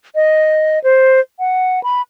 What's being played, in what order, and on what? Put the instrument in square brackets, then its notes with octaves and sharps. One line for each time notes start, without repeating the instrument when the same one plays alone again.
[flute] D#5
C5
F#5
B5